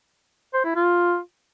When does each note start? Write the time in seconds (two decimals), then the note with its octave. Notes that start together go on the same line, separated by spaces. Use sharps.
0.54 C5
0.65 E4
0.76 F4